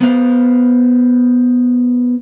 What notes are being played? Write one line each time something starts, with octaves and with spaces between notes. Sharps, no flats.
B3 C5 F5